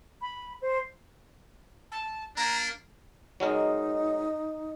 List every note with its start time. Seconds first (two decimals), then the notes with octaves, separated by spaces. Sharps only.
0.21 B5
0.61 C5
1.92 A5
2.37 A#3 D4 A#5
3.40 F#3 G#3 D#4 A#4